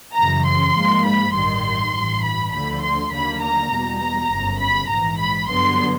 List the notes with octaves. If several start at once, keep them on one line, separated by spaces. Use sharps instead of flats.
F#2 C#3 E3 A#5
C6
G#2 F3 A#3
B5
A1 G2 D#3 C6
A1 G2 E3
B5
D2 D3 F3 A3 B5
C6
D#2 D3 F#3 A#3 B5
A#5
E2 B2 G3
A#5
G1 F#2 C#3
B5
A#1 G#2 E3 A#5
B5
G2 D3 F#3 B3 C6